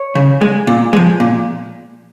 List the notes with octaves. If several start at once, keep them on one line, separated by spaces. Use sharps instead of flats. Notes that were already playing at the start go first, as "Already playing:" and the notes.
Already playing: C#5
C#3
G#3
A#2
F3 G#3
A#2